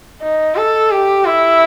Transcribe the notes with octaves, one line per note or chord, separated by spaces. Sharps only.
D#4
A4
G4
E4